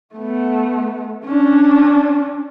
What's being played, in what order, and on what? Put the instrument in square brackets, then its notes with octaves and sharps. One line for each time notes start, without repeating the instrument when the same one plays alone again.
[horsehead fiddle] A3 B3
C#4 D4